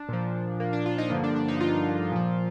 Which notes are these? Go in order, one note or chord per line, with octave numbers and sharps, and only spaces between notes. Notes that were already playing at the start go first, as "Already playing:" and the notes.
Already playing: D4
A#2 F3
A#3
D4
F4
D#4
G2 D3 F3 A#3
D4
D4
D#4
F4
A#2 F3